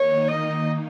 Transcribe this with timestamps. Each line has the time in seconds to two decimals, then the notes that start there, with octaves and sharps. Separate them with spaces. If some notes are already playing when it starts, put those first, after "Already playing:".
Already playing: D#3 A#3 D#4 C#5
0.28 D#5